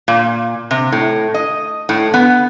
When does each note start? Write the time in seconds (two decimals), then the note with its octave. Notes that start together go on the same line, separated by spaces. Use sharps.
0.08 A#2
0.71 C3
0.92 A2
1.34 D#5
1.89 A2
2.14 B3